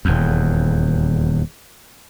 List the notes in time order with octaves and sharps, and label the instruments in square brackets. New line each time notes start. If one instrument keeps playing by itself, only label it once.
[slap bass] D#1 E2